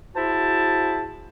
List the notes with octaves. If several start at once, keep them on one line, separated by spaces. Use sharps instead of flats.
E4 F#4 G#4 C5 A5